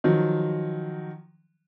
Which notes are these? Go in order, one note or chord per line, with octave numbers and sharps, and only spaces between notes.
D#3 F3 F#3